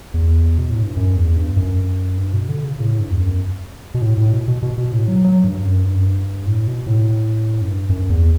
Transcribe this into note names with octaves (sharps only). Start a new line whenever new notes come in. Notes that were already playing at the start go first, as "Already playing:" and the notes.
E2
B2
A2
G2
F#2
E2
G2
F#2
G2
B2
D3
C#3
A2
G2
E2
F#2
B2
A2
A2
B2
B2
B2
B2
A2
F#3
F#3
G2
F#2
G2
F#2
G2
A2
B2
A2
F#2
G2
F#2
E2